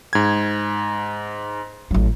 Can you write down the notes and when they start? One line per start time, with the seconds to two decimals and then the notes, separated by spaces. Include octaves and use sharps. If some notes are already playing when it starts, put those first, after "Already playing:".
0.13 G#2 G#6
1.91 A1 F#3